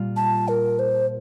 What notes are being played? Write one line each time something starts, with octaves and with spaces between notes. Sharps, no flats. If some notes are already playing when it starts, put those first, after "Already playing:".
Already playing: A#2 G3 F4
A5
A#4
C5